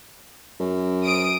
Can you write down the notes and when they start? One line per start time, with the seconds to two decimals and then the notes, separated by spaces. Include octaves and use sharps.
0.60 F#2
1.04 D#6 D7